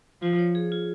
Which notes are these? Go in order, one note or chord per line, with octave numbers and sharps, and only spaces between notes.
F3 F4
C#5
G#4
F4